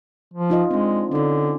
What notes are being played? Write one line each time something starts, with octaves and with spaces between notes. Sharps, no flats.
F3
D#4 F4 D#5
G#3 C4 D4
D3 C#4 D#4